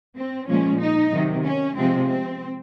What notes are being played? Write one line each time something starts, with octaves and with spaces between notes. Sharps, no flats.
C4
A#2 F3 G#3 C#4
D#4
C3 D#3 F#3
C#4
C3 F3 G#3 C4
C4